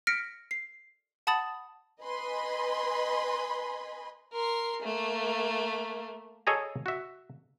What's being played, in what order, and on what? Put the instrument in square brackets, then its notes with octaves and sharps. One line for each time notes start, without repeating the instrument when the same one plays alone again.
[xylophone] F6 A#6 B6 C#7 D7
C7
F#5 A5 B5 D#6 A6 F#7
[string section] B4 D#5 G#5 B5 C6
[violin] A#4 C6
A3 A#3
[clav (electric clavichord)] G#4 A4 C#5 D#5 G#5 A#5
F#4 E5